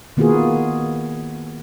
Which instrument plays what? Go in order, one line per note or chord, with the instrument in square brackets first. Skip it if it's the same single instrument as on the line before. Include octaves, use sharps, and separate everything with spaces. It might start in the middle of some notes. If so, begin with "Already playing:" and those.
[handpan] D#3 A#3 B3 F4 F#4 G#4